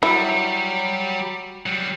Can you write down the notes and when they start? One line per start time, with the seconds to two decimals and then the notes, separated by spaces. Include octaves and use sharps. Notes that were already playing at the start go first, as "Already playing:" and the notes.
0.03 F#3 G3 E4
1.66 F#3 G3